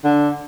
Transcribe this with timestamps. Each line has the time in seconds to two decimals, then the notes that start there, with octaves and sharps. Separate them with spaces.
0.05 D3